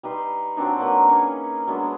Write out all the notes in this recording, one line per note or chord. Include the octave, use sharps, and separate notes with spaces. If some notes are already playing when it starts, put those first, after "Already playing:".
G3 D#4 B4 C6
F#3 C4 D4 D#4
F#3 A#3 B4
C#4 G#4
F#3 G#3 B3 D4